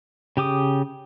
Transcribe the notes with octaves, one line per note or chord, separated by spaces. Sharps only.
C#3 G4 D6 D#6